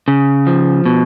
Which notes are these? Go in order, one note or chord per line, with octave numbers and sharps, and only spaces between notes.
C#3
F3
B2